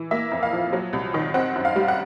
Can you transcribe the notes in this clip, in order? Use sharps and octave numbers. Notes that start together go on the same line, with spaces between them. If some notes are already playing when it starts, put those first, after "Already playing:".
Already playing: E3
A#3 E5
F2
F5
F3
F#3
C2
D#3
C4 F#5
F#2
F5
G3
F#5